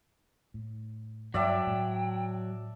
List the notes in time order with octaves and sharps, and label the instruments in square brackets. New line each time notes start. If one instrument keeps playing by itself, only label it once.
[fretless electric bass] A2
[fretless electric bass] G2 [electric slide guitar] F#3 [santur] D5 E5 A5 [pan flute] G5
[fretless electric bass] A2 G#3